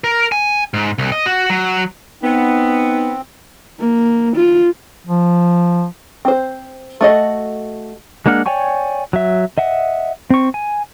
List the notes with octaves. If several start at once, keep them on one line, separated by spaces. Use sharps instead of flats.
A#4
G#5
G#2
C2
D#5
F#4
F#3
B3 C4 D#4
A#3
F4
F3
C4 C5
A3 F#4 D#5
G#3 A#3 D4 F#5 F6
C#5 D5 G5 G#5 C#6
F#3 E5
D#5 E5 F#5
C4 C#6
G#5